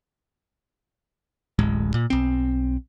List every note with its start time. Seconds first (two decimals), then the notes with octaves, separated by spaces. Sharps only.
1.59 D1 A1 G#3
1.94 A#2
2.10 B1 C4